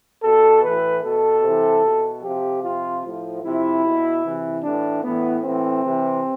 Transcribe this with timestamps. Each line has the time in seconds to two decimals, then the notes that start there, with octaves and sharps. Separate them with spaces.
0.23 B2 A4
0.63 A2 E3 B4
1.03 B2 A4
1.43 C3 E3
1.83 B2
2.23 C3 F3 G4
2.63 C3 F3 F4
3.04 A2 F3
3.44 C3 F3 E4
3.84 B2
4.24 C3 E3
4.63 A2 E3 D4
5.03 A2 E3 B3
5.43 A2 E3 C4
5.84 C3 E3